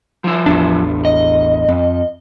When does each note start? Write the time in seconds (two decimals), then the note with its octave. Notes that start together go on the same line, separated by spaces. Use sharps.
0.24 F3 E4
0.46 A1 E2 D4
1.05 D#5
1.68 F2